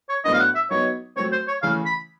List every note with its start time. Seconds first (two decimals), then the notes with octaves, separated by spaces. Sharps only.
0.09 C#5
0.24 A2 F#3 B3 D4 D#5
0.33 F5
0.40 F#5
0.55 E5
0.70 F#3 B3 D#4 C#5
1.16 F#3 A3 C4 C#5
1.32 C5
1.48 C#5
1.62 C#3 E3 A3 C#4 F5
1.86 B5